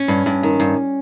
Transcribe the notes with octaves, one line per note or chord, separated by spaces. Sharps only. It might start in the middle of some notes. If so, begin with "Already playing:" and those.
Already playing: C#4
G2
G2
D#3
G2